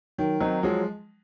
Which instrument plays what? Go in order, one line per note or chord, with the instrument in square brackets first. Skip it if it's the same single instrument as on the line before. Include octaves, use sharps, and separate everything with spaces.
[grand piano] D#3 [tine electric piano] F#3
[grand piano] D#3 F#3 [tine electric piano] C4 D#4
[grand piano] F3 G#3 [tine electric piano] F#3